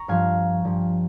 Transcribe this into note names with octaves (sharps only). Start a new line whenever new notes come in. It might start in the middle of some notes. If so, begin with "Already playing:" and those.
Already playing: A#5 C#6
G2 F3 F5 G#5
G2 F3